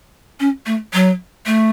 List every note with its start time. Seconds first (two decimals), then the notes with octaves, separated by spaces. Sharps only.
0.40 C#4
0.66 A3
0.93 F#3
1.46 A3